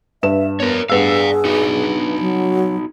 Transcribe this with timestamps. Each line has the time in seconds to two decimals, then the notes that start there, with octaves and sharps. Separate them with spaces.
0.23 G2 B4 E5 E7
0.60 B3 A#4 C#5
0.90 G2 B3 G#4 D5 F5 E6
1.45 D#4 F#4
2.20 F#3